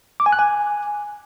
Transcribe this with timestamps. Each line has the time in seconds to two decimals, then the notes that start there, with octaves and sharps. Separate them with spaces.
0.20 D6
0.26 G#5
0.32 F#6
0.39 G#5